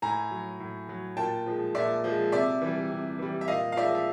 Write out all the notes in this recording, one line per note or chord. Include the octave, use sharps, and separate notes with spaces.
A2 G#5 A#5
F#3
A2
F#3
A#2 G5 A5
F3 G#3
A#2 D5 E5
F3 G#3
C3 D5 E5
E3 G3
C3
E3 G3
E5
A#2 D#5 F5
F5
F3 G#3 D5 E5
E5